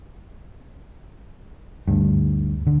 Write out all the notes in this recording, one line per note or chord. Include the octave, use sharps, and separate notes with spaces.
D2 G2
D3